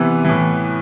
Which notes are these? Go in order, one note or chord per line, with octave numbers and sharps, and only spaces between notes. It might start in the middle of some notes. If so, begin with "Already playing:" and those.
Already playing: C3 E3 B3
A2 E3